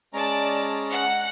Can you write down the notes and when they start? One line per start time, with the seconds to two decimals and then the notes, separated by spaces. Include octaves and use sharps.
0.13 G#3 C#4 D5 A5 A#5
0.90 F#5